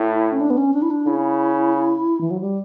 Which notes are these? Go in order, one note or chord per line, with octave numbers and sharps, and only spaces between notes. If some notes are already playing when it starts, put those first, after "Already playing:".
Already playing: A2 E4
C#4
D4
B3
C#4
D4
E4
D4
C#3 E4
E3
F#3
G3